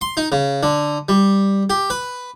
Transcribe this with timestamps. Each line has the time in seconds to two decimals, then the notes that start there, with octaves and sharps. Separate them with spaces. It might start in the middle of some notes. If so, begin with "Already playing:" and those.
0.01 C6
0.17 D#4
0.32 C#3
0.63 D3
1.09 G3
1.70 G4
1.90 B4